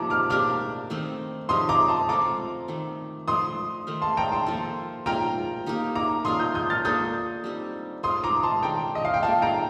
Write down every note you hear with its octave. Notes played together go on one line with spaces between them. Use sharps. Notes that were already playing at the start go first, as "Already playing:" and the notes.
Already playing: C3 F3 A#3 D#4 A5 A#5 D6
D6 F6
A#3 D4 G4 A#4 D6 F6
D#3 A3 C4 D#4
F3 C4 G4 A#4 C6 D#6
A#5 D6
A5 C6
A3 C4 F4 A4 A#5 D6
D#3 A3 C4
F3 A3 D4 C6 D#6
D#3 A3 D#4 A#4
A5 C6
G5 A#5
A5 C6
F3 A#3 F4 A4
A#3 F4 A#4 G5 A#5
A#3 D#4 G4
A#5 D6
A#3 F4 A#4 C6 D#6
D#6 G6
D#6 G6
F6 A6
A#3 D4 F4 A4 D#6 G6
G3 C4 D#4
A3 C4 F4 C6 D#6
A#5 D6
A5 C6
D#3 A3 D4 G5 A#5
D#5
F5
G5
A#3 F4 A4 F5 A5
G5 A#5